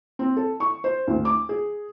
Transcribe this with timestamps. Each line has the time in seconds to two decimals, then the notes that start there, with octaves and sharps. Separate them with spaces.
0.19 C4
0.37 A4
0.60 C#6
0.84 C5
1.07 D2
1.25 D6
1.49 G#4